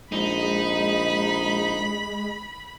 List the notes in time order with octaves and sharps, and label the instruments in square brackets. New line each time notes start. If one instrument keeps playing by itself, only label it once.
[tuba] A#1 [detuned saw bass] G#3 [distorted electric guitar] D#4 [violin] B5